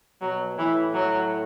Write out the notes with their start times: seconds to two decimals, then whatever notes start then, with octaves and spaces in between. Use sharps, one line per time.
0.21 B2 F#3
0.58 A2 E3
0.94 F#3